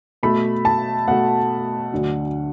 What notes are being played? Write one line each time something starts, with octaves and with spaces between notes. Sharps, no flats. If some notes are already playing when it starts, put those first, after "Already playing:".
B2 A3 B5
A5
B2 A3 F#5
D2 D3 F#3